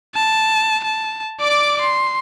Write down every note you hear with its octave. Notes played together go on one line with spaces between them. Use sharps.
A5
A5
D5 D6
C6